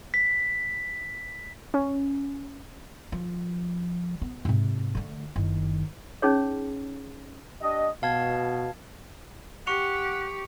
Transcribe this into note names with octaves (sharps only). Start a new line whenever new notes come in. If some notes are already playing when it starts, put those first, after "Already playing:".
B6
C#4
F3
B3
G#2 C3
D3 A3
F#1 D#3
C#4 D#4 G#4 C#5
D4 G4 D#5
B2 F5 A5 G#6
G4 F#5 C#6 C#7 F7